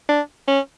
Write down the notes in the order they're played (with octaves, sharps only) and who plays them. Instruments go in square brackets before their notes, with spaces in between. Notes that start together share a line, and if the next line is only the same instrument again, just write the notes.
[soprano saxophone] D4
C#4